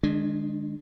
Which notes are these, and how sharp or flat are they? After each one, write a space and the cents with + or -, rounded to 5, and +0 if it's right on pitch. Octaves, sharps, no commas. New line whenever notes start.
D#3 -40 G#3 +0 D4 +0